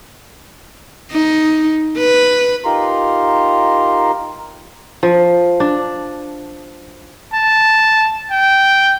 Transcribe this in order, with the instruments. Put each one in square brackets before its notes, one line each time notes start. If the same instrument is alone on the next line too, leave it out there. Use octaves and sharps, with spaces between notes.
[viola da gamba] D#4
B4
[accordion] D#4 F4 G4 A#4 A#5 C6
[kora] F3
D4
[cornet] A5
G5